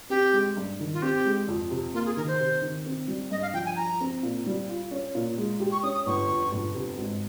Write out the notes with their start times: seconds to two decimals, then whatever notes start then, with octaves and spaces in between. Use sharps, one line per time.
0.10 C4 G4
0.33 G#3
0.57 G2
0.79 D#3
0.93 F4
1.02 C4 G4
1.25 G#3
1.48 F2
1.71 C3
1.94 A#3 F4
2.06 G#4
2.17 D#3 A#4
2.28 C5
2.40 C3
2.62 D#3
2.86 C4
3.08 G3
3.31 G2 D#5
3.42 F5
3.54 F3 G5
3.66 G#5
3.76 F4 A#5
4.01 C4
4.23 A#2
4.46 G3
4.69 F4
4.91 C#4
5.15 A#2
5.38 G#3
5.60 G4
5.72 C#6
5.83 C#4 D#6
5.94 D#6
6.06 G1 C#6
6.29 F2
6.52 G1
6.74 C3
6.98 G#1